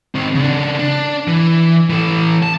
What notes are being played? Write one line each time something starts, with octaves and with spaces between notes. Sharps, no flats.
D#3 C4
C#3 D4
D4
E3
E3 A4
A5